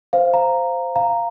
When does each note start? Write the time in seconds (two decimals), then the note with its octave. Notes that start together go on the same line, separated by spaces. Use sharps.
0.13 C5 F5
0.34 F5 A#5
0.96 F5 A#5